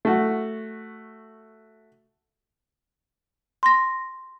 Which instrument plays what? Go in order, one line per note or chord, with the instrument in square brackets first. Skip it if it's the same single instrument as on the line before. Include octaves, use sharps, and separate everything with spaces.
[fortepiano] A3 F#4
[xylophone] C6 A#6